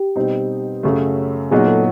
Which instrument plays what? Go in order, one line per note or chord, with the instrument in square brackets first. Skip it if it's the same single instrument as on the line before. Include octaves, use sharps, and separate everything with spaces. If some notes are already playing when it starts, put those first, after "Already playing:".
Already playing: [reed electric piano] G4
[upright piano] B2 G3 C4 D#4
F#2 C#3 F#3 A3
[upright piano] A#2 F#3 B3 D#4 [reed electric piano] G#4
[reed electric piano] A4